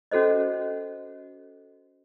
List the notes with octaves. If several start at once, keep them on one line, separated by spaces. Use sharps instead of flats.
C#4 F#4 A4 C5 D#5